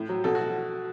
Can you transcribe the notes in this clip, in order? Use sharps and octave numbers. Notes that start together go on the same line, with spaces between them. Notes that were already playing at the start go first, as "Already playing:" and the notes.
Already playing: A2
F#3
B2 A4
F#4